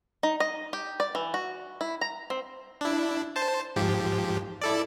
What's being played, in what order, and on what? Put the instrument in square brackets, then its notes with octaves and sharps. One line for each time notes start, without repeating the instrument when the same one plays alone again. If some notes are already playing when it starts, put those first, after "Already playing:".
[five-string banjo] D#4
D#5
G4
D5
E3
F#4
E4
A#5
C4
[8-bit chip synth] D4 E4
C5 A5
G#2 F3 G4
E4 A4 D5